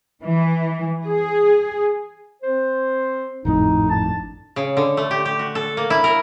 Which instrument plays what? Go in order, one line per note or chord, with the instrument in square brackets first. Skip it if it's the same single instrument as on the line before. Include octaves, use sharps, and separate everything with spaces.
[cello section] E3
G#4
[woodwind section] C4 C5
[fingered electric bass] G#1 F2 A2 [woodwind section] D#4
[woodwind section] D4 A5
[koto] C#3
D3
A3
G4
G4
F#4
A4
A#3
E4
A#4